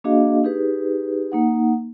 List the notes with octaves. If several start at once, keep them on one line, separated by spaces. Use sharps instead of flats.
A#3 D4 F#4 G#4 D#5 F5
D#4 G4 G#4 B4
A#3 D#4 F#5